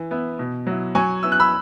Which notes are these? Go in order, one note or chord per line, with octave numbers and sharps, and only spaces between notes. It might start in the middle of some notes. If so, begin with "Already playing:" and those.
Already playing: E3
B3 E4
B2
F#3 E4
F#3 G#5 C#6
B3 E4 E6
F#6
B5 E6